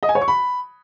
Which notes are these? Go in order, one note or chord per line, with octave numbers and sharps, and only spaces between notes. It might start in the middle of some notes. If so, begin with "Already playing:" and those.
D#5
G#5
C#5
C#6
B5